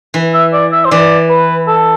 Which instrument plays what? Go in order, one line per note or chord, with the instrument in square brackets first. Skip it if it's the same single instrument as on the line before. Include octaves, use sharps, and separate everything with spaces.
[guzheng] E3
[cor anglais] E5
D5
E5
C5
[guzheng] E3 [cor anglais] D5
[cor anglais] B4
A4